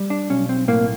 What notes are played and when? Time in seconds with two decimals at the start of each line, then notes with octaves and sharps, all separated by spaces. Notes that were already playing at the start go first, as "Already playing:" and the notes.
Already playing: G3
0.10 D4
0.30 B1 C#4
0.49 C4
0.68 A2 A#3